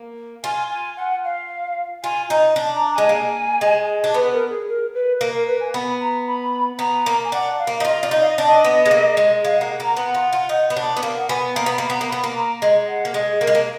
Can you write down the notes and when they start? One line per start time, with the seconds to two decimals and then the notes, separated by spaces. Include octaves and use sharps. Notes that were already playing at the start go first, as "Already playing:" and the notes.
Already playing: A#3
0.44 F4 G#5
0.71 G#5
0.97 F#5
1.24 F5
2.04 F4 G#5
2.30 D#4 A#5
2.56 D4
2.74 A#5
2.91 A#5
2.95 G#3 G#5
3.09 A#3
3.61 G#3
4.04 D4
4.14 B3 B4
4.33 A#4
4.50 G#4
4.68 A#4
4.94 B4
5.20 A#3 A#4
5.34 A#4
5.47 B4
5.60 G#5
5.74 B3 B5
6.00 A#5
6.27 B5
6.79 B3 A#5
7.06 A#3
7.24 G#5
7.32 D4 F#5
7.59 F5
7.67 A#3
7.80 D#4
7.85 F4 D#5
8.02 F4 D5
8.11 D#4
8.20 F5
8.29 D#5
8.37 D4 D5
8.46 D#5
8.64 B3
8.86 G#3
8.91 A#3
9.17 G#3
9.44 G#3 F5
9.57 A#3 F#5
9.71 F#5
9.80 A#3 A#5
9.97 B3 F#5
10.14 F4
10.33 F4
10.49 D#4
10.70 B3
10.77 D4
10.97 B3
11.03 A#3 F5
11.17 F#5
11.29 B3 G#5
11.56 A#3 A#5
11.66 B3
11.73 B5
11.78 A#3
11.90 B3 A#5
12.01 A#3
12.09 B3 B5
12.24 A#3
12.35 A#5
12.62 G#3
12.87 F#5
13.05 A#3
13.14 G#3 G#4
13.41 A#3 A#4
13.47 G#3
13.55 A#3